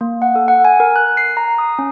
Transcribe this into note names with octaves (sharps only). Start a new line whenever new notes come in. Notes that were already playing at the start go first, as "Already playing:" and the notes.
A#3
F#5
A4
F#5
G#5
A#4
F#6
C7
A#5
D#6
C#4